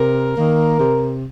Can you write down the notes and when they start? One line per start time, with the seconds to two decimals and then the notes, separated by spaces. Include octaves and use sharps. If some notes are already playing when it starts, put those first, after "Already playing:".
Already playing: C3 A#4
0.35 D#3 A#3
0.79 C3